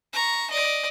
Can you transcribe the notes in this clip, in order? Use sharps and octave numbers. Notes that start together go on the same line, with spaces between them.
A#5 C#6
D5 D#5